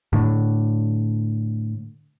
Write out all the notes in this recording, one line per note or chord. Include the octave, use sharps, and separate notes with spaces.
A2 D3